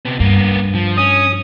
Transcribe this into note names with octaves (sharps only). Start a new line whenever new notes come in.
C3 B3
G2 A#3 B3
F3
C#4 D#6